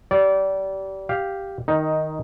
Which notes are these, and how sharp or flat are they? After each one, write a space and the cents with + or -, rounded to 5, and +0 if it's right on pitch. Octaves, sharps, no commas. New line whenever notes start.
G3 -30 D5 -25
G4 +0 F5 +0
D#3 +0 D#4 +10